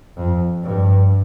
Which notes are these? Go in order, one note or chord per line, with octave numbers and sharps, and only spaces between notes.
F2
G2